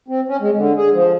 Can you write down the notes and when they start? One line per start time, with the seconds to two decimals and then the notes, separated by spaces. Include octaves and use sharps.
0.08 C4
0.28 C#4
0.41 G#3
0.57 D3
0.77 G#4
0.93 F3